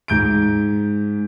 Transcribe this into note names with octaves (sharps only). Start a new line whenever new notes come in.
G#2 G6 D7